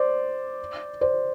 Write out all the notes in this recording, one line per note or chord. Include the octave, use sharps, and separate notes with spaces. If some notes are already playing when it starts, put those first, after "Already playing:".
Already playing: C5 D5
C5 D5